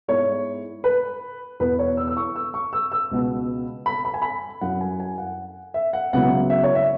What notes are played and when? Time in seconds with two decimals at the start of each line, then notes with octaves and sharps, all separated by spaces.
0.08 G#2 G#3 B3 E4 C#5
0.84 B4
1.60 E2 B2 B3 E4 B4
1.79 C#5
1.97 E6
2.07 E6
2.17 C#6
2.36 E6
2.54 C#6
2.73 E6
2.92 E6
3.11 C#2 B2 B3
3.86 B5
4.05 B5
4.14 G#5
4.22 B5
4.61 F#2 F#3 E4 F#5
4.81 G#5
5.00 G#5
5.18 F#5
5.74 E5
5.93 F#5
6.13 C#2 C#3 F#3 B3 E4 F#5
6.50 E5
6.63 C#5
6.75 E5